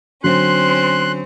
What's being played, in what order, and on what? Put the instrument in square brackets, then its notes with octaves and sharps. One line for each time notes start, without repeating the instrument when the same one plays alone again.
[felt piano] D3 F#3 [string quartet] C4 C#4 [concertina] C6 F#6